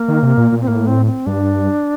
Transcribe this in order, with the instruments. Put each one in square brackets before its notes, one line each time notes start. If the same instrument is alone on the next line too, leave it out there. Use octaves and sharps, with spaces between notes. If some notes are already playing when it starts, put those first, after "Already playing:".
Already playing: [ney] A#3
[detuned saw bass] D#3
C3
A#2
A#2
[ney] C4
[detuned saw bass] A2 [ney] A#3
[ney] C4
C4
[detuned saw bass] G2 [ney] D4